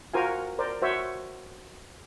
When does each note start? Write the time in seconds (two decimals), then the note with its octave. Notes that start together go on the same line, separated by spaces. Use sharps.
0.14 F4 F#4 A#4 C5 F5 G#5
0.59 A#4 C5 D5
0.82 F#4 C5 C#5 E5